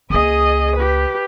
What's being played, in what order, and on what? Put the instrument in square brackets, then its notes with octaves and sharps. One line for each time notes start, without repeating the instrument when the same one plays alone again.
[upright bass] C#2 A#3 [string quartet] G#4 D#5 D#6
[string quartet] G4 B4